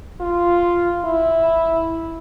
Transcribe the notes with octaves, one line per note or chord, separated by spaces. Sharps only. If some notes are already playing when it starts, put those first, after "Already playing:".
F4
E4